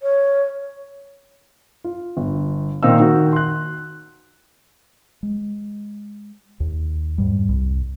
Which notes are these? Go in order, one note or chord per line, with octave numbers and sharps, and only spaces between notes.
C#5
F4
G1
A#2 D#3 C4 D#4 F5 E6
D#3 F#4
C6 F#6
G#3
D#2
F2 G#2 G3
C2